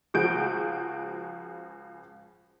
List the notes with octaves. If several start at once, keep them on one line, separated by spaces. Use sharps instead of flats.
C#2 F3 F#4 G#4 G6 D7